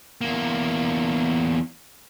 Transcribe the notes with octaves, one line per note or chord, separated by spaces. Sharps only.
E2 A#3